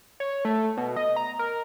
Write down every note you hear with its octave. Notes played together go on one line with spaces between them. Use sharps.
C#5
A3
B2
D#5
A#5
A#4